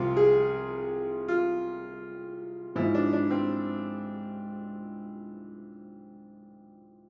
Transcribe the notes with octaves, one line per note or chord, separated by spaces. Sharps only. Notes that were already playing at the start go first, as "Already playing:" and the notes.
Already playing: C2 C3 F3 F4
G#4
F4
G#2 F3 E4
D4
D4
C4